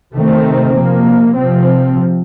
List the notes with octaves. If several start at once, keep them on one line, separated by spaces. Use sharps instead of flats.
C3 D#3 A3 C4
C3 F3 A#3
C3 F3 C4